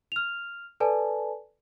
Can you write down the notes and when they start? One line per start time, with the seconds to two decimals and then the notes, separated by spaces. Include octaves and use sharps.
0.12 F6 F7
0.80 A4 B4 D5 G#5 A5